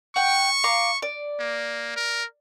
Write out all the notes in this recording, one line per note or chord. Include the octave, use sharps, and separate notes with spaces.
F#5 G5 C#6
F5 A#5 D6
D5
A#3
A#4